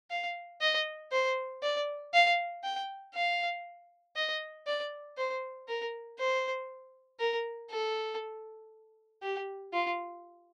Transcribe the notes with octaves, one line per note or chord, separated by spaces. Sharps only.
F5
D#5
C5
D5
F5
G5
F5
D#5
D5
C5
A#4
C5
A#4
A4
G4
F4